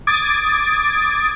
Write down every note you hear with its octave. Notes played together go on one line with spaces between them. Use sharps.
D6 D#6 G#6 A6 D7